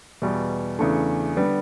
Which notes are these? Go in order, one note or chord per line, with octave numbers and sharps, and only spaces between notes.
E2 B2 G3
E2 C#3 E3 A3 D4
D3 G3 B3